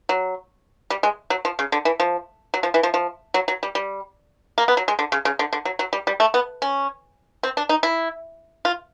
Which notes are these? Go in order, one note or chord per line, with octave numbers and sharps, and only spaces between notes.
F#3
G3
G#3
F#3
F3
C#3
D3
E3
F3
F#3
F3
E3
F3
F3
F#3
F#3
G3
G3
A#3
B3
F#3
G#3
D3
C#3
C#3
D3
D3
F#3
F#3
G3
G3
A3
B3
C#4
C4
D4
D#4
E4
F4